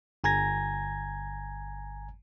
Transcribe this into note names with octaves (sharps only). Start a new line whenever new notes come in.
G1 G#5 A#5 G#6 A#6